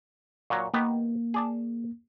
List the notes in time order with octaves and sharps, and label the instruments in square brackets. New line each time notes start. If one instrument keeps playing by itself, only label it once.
[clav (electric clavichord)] A#2 F#3 [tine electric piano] C#6
[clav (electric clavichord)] D#3 B3 G4 [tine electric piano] A#3
[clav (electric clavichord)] G#4 D5 A5